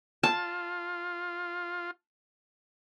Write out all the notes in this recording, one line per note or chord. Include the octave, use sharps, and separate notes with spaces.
F4 A5